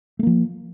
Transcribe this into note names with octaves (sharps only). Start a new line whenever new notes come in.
F3 A3 A#3